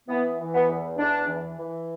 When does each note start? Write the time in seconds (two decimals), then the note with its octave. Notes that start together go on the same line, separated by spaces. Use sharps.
0.08 E3 B3
0.38 E3
0.53 B3
0.67 E2
0.97 E2 D4
1.27 E3
1.57 E3